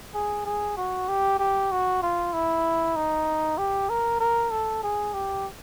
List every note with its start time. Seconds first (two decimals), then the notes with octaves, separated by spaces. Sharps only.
0.14 G#4
0.45 G#4
0.77 F#4
1.08 G4
1.39 G4
1.71 F#4
2.03 F4
2.33 E4
2.96 D#4
3.58 G4
3.90 A#4
4.20 A#4
4.51 A4
4.83 G#4
5.14 G4